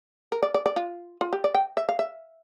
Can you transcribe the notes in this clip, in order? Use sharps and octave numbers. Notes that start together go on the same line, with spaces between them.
A#4
D5
D5
D5
F4
F4
G4
D5
G5
E5
F5
E5